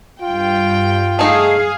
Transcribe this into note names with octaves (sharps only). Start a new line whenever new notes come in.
G2 F4 G5
A3 D#4 G#4 F5